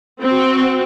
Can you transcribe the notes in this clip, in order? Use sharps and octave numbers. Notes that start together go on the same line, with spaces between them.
C4 F#4